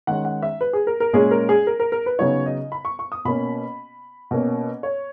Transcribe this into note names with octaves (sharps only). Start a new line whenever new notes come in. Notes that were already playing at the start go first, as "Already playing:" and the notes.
D#3 G#3 C#4 F#5
F#5
E5
B4
G#4
A#4
A#4
A#2 G#3 C#4 G#4
A#4
G#4
A#4
A#4
A#4
B4
C#3 F#3 B3 D#4 C#5
D#5
B5
C#6
C#6
D#6
B2 A#3 C#4 B5
B2 A#3 C#4
C#5